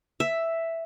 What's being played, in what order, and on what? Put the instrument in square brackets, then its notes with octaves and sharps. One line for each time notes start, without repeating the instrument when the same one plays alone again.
[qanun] E5